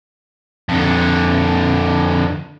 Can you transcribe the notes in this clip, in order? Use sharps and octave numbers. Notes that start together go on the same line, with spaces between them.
F2 D3